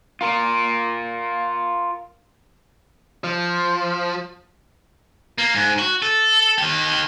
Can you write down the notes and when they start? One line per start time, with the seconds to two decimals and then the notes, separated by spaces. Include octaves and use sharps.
0.21 F4 A#4
3.24 F3
5.38 A#3
5.55 G#2
5.79 F#4
6.02 A4
6.58 D#3 G4